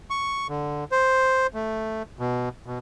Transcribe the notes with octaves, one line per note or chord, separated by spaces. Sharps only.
C#6
D3
C5
A3
B2
B2